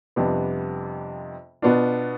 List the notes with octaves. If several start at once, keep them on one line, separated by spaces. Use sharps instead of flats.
F2 C3 G3 B3 D4
B2 B3 D4 F4